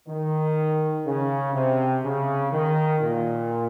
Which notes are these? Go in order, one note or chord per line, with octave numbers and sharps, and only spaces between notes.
D#3
C#3
C3
C#3
D#3
A#2